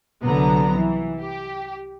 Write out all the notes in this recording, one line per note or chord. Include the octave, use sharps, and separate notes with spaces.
C2 D3 F#3 B3 A#5
E3
G4